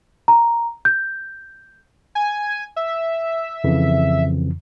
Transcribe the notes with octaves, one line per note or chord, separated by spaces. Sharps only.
A#5
G6
G#5
E5
F2 C#3 E3